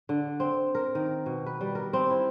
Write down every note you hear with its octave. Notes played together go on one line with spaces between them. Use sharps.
D3
C4
A#4
D#3
B2
B4
G3
A#4
C4
E4